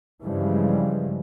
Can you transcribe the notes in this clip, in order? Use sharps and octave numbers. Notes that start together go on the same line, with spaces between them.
G2 C#3 E3 F3 G3 G#3